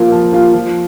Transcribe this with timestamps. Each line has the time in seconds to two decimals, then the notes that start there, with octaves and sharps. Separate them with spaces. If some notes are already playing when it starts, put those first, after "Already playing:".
Already playing: F3 A#3 F4
0.12 F3
0.33 A#3 F4
0.53 F3